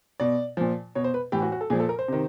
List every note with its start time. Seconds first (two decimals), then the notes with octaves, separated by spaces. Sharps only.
0.20 B2 D5
0.57 A#2 F3
0.95 B2 C#5
1.04 C5
1.14 B4
1.32 A2 E3 G4
1.42 F#4
1.52 F#4
1.61 A4
1.70 A#2 F3 G#4
1.80 A4
1.89 A#4
1.99 C5
2.08 C3 D#3